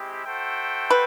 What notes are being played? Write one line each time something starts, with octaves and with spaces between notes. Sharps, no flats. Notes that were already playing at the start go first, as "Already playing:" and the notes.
Already playing: G#3 C4 E4 G4
F#4 A4 C5 E5 G5
B4